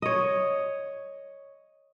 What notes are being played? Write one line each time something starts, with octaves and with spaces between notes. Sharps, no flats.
C#5 D#5